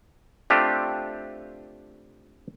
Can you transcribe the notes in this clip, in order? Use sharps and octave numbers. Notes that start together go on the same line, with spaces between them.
A3 C4 D4 F4 G4